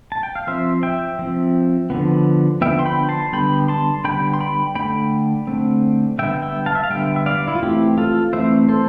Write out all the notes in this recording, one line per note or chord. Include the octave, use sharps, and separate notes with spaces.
A5
G5
F5
F3 C4 C5 E5
E5 G5
F3 C4
D3 F3 B3
D3 F3 B3 E5 G5
C6
G5 B5
A5 C6
D3 G3 B3 G5 B5
A5 C6
D3 G3 B3 G5 B5
C6
G5 B5
D3 A3 C4 G5 B5
D3 A3 C4
D3 G3 B3 E5 G5
E5 G5
F5 A5
E5
F5
D3 G3 B3 E5 G5
E5
D5 F5
E4
F4
E3 A3 C4 E4 G4
F4 A4
E3 A3 C4 C5 E5
A4 C5